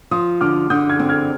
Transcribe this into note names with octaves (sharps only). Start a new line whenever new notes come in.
F3 C6 D#6
D3 D6 F6
D3 D#6 G6
F6 G#6
C4
F6 G#6